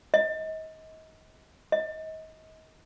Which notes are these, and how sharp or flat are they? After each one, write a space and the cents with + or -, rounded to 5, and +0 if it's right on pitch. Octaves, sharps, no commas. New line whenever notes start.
D#5 +30
D#5 +30